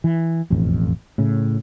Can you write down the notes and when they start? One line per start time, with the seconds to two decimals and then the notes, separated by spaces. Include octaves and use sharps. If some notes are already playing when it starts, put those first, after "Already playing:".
0.04 E3
0.50 E1 A1 F2
1.18 A2 C#3